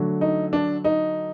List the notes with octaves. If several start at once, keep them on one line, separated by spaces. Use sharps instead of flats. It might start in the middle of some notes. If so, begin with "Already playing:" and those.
Already playing: D3 F#3 A3
D#4
D4
D#4